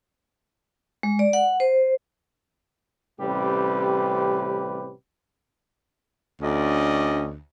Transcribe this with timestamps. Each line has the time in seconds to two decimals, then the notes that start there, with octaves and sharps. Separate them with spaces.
1.03 G#3
1.19 D5
1.33 F#5
1.60 C5
3.20 A1 C3 G3 C#4 G4 B4
6.41 D2 C#4 D5 D#5